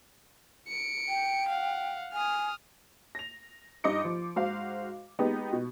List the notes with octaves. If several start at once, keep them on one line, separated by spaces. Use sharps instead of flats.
C#7 D7
G5
F5 F#5
G#5 D#6 F6
A#6 F7
G2 D#4 D#5 D6 C#7
F3
G#2 F#4 C5 F5
G#3 B3 D#4 G4
B2